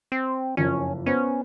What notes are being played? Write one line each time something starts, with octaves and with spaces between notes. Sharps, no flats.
C4
F#1 F2 C#4
B3 C#4 C5